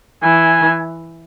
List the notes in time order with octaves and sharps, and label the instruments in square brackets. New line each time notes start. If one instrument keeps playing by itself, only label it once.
[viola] E3 [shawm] G#5